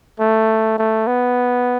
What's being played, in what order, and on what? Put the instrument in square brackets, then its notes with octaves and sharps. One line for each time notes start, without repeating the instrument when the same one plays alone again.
[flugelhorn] A3
A3
B3